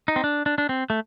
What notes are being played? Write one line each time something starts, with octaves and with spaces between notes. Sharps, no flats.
D#4
C4
D4
D4
D4
C4
A3